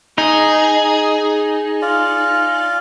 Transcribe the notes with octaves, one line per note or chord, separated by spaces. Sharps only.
D#4 G#4
F4 D5